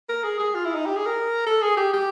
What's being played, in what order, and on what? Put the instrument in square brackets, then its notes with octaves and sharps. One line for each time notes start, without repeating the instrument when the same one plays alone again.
[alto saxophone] A#4
G#4
G#4
F4
E4
D#4
G4
G#4
A#4
A4
G#4
G4
G4